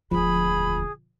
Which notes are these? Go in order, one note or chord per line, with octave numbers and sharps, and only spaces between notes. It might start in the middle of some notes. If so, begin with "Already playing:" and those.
E1 D2 F3 G#4 B5